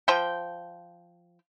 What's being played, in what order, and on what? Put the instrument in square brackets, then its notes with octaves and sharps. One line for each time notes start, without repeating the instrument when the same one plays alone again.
[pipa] F3 C5 G5